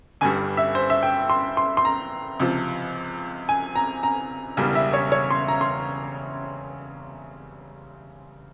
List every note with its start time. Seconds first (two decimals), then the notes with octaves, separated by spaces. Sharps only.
0.21 G1 G2 G3 G#5
0.57 E5
0.75 C5
0.90 E5
1.03 G5
1.30 C6
1.57 C6
1.77 C6
1.85 A#5
2.40 C#2 C3 F3
3.49 G#5
3.76 A#5
4.03 A#5
4.57 E1 E2 C#3 G3
4.75 E5
4.93 C#5
5.12 C#5
5.30 C6
5.48 A#5
5.61 C6